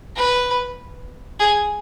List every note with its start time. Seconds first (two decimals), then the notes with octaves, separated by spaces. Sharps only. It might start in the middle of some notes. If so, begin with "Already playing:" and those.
0.16 B4
1.40 G#4